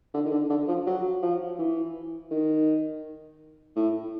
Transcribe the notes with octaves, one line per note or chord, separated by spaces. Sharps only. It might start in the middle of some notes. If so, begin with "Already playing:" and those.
D3
D#3
D3
D3
F3
F#3
F3
E3
D#3
A2